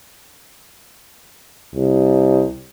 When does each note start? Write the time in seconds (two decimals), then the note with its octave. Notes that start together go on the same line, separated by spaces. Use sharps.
1.75 C2